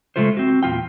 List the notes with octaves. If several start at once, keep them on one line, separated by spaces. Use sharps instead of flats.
C#3 G#3 A3 F4 C5
C4 F#4
E2 A#2 B3 F4 G5